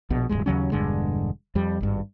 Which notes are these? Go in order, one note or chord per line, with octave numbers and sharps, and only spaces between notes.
A#1 B2
D1 B1 G2 G#3
D#2 C#3 F#3 C#4
E1 G2 D3 G#3
F2 G3
G#1 G2